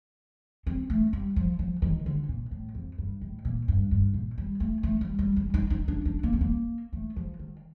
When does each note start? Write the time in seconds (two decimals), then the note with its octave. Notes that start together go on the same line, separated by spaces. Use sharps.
0.67 C4
0.90 A3
1.13 G3
1.36 F3
1.59 F3
1.82 D#3
2.06 D3
2.29 A#2
2.51 A2
2.75 F2
2.98 G2
3.21 A2
3.45 A#2
3.68 G2
3.91 G2
4.14 A#2
4.38 G3
4.60 A3
4.83 A3
5.01 G3
5.19 G3
5.36 G3
5.54 D#4
5.70 D#4
5.88 D4
6.05 D4
6.23 A#3
6.33 C4
6.41 A#3
6.93 A3
7.16 F3
7.39 D#3